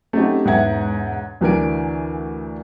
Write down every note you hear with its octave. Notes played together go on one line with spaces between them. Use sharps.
A3 C4 C#4 D#4 F#4 G4
E1 G#2 B3 E5 F#5 G#6
D2 E3 D4 A#4 G#5 D7